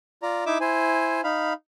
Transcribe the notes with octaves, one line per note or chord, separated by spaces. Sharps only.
F4 D5 A#5
D#4 E4 E5 D6 E6
E4 C5 G#5
D#4 F5 B5